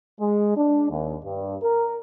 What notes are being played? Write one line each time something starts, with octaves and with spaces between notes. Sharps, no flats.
G#3
D4
D#2
G2
A#4